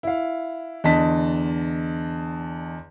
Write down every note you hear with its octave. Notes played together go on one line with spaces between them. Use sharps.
E4 F5
E2 D3 D#5 A5 B6